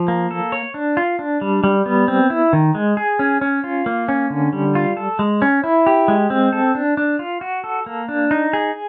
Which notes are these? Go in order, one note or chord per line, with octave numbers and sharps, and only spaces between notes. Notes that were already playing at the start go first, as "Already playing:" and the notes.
Already playing: F3
A#3
A4
C#5
D4
F4
D4
G3
G3
B3
C4
E4
D#3
G#3
G#4
C#4
C#4
F4
A#3
C#4
D3
G3
F4
A4
G#3
C#4
E4
G4
G#3
C4
A4
D4
D4
F4
F#4
A4
A#3
D4
D#4
G#4